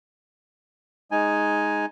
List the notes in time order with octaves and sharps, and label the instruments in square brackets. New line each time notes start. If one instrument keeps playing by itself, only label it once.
[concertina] G#3 D#4 G#5